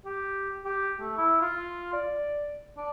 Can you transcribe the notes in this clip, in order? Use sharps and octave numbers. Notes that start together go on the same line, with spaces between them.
G4
G4
A3
E4
F4
D5
D4